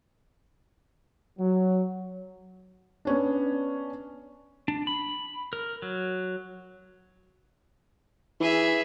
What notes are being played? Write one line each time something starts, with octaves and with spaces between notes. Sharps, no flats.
F#3
B3 C#4 D4
D4
B5
A#4
F#3
E3 G#4 E5